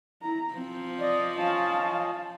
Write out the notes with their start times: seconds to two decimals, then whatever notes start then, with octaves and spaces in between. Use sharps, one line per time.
0.22 E4 A#5
0.54 F3 C4
1.00 D5 D#5
1.35 C#4 F4 D#5 F5 A5